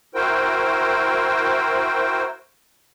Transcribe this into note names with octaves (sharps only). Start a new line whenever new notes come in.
E4 F#4 A#4 C5 G5